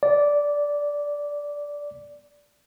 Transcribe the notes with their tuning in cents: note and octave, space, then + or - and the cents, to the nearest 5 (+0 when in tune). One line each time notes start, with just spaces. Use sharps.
D5 -10